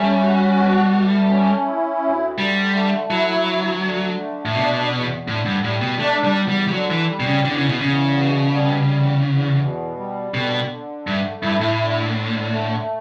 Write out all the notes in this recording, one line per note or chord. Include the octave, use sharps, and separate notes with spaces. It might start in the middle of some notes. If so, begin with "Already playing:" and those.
Already playing: G3 A3 C#4
F#4
B2
A3
C#4
E4
D2
D3 G3
A3
F#3 E4
D2
D3
A3
A2
B2 D4
E2
A2 D3
G2
A2 G3
B2
A3 D4
G3
E2
G3
G3
D3 F#3
E3
G3
B2
C#3
E2 D3
C#3
B2
E2 C#3
B2
G3
E2
E2
B2
G3
B2 D3
D3
G2 A3
G2 E4
A2
D3
D3
A3